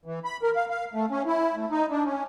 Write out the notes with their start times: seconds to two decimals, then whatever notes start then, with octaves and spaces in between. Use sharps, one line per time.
0.06 E3
0.25 B5
0.43 A#4
0.56 F5
0.70 F5
0.93 A3
1.11 C#4
1.26 E4
1.56 A3
1.71 D#4
1.91 D4
2.05 C#4